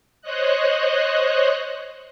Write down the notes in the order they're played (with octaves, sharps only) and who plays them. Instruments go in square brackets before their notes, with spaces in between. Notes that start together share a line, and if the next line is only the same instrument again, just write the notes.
[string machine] C5 C#5 D#5 F#6